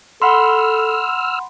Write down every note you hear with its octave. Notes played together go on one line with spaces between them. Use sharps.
A4 F#5 B5 C6 E6 F6